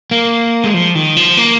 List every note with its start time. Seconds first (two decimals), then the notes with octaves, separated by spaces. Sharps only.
0.11 A#3
0.64 G#3
0.74 F3
0.95 D#3
1.17 F3
1.37 A#3